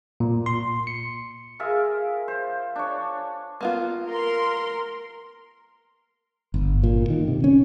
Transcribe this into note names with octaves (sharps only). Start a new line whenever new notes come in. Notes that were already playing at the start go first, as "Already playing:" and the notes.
A#2
C6
C#7
F4 G#4 A#4 E5
C5
D4 C#5
A#3 B3 F4
A#4 C6
G1
A#2
D#3
C3
C#4